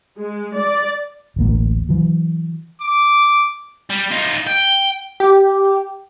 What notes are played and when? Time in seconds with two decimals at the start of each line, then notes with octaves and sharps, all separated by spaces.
0.19 G#3
0.59 D5
1.36 D1 A1 A#3
1.89 E3 F#3
2.81 D6
3.90 G3
4.11 D#4 F4
4.47 G5
5.20 G4